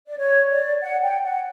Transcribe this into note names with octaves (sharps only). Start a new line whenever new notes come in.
D5
C#5
D5
F#5
G5
F#5